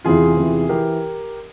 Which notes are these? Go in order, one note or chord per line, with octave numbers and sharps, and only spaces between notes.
E2 C3 E3 F4 G#4
E2 C3 E3
E3 G4 A#4